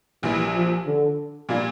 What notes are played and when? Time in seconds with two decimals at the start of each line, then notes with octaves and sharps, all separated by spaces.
0.23 A#1 A#2 E3 G3
0.55 F3
0.86 D3
1.49 A#2 G3 A#3 D4 F4